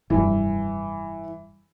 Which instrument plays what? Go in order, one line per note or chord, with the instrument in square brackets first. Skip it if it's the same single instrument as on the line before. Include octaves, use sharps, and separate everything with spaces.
[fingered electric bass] F1 G2 [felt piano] E3